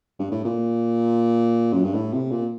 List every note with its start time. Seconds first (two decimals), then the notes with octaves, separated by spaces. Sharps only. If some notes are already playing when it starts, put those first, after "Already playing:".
0.19 G2
0.31 A2
0.44 A#2
1.74 F#2
1.84 G2
1.95 A2
2.13 C3
2.31 A#2